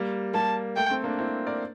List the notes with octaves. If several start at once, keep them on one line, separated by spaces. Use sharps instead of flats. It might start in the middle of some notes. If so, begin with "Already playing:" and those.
Already playing: G3 A#3
G3 A#3 A5
A3 G5
A3 C4
A#3 D4
C4 E4
A#4 D5